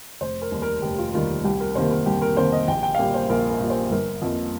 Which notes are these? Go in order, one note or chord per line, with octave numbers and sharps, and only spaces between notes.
F1 C5
A#4
D#2 D#3 G3
A#4
F1 G4
F4
D#2 D#3 G3 F4
C2 G4
A#4
C3 D#3 A#3 C5
A#4
C2 G4
A#4
C3 D#3 A#3 C5
D#5
A#1 G5
G5
F5
A#2 G3 A#3 G5
C5
A#1 A#4
A#4
A#2 G3 A#3
C5
G1 A#4
F2 F3 A#3